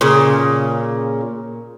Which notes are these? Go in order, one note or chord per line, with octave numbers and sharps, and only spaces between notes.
A#2 C#3